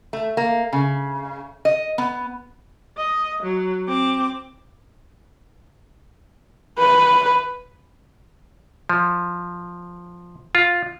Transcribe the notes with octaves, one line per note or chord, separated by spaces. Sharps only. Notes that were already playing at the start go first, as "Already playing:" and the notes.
A3
A#3
C#3
D#5
B3
D#5
F#3
C4 D6
B4
F3
F4